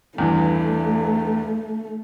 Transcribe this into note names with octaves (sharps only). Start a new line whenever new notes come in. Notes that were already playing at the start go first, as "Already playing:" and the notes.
E2 G2 E3 A3